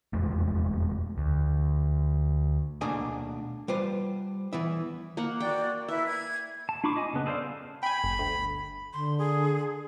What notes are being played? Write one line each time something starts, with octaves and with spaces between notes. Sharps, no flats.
F1 E2 G#3 A3
D2
B2 A3 A#3 D4 G#4 G#5
G3 F4 B4 C5
E3 B3 E4
A#3 A#4 F#5
F#4 D5 G5
E4 B4 E5
G#6
A5
D4 F4 B5 C#6 D6
D#5 G#5
C#3 B3
G#4 A4 C5 D5 F5
G5 G#5 B5
G1
D2
D3 C6
G#4